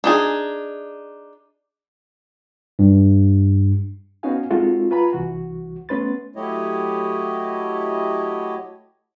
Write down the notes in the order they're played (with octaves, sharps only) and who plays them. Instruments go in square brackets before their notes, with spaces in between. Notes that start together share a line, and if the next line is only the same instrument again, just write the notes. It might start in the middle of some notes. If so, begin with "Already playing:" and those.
[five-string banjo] D4 D#4 G#4
[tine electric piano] G2
[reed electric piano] B3 C#4 D#4 F#4 F5 G#5
G#3 C4 D#4 F4 F#4 A4
F4 B4 G#5 A#5 B5
C2 E3 F#4
A3 B3 C#4 B4 C6 A6
[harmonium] F#3 A3 E4 G4 C#5 D#5